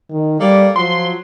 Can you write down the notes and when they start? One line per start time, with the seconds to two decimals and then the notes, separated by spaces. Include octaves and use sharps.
0.11 D#3
0.40 G3 A#3 A4 D5
0.76 F3 F#3 C6